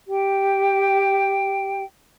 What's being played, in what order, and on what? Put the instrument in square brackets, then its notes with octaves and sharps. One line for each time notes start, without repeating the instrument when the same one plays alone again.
[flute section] G4 G5